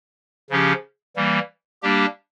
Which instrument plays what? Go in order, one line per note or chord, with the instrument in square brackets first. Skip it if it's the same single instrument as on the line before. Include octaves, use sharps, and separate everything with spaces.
[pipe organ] C#3 F3 C#4 G4
E3 G3 A#3
G3 A#3 D4 G4